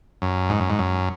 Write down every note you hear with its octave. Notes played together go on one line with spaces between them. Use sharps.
F#2
G#2
F#2
G#2
F#2